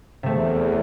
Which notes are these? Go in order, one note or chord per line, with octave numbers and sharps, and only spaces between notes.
E2 C3 A3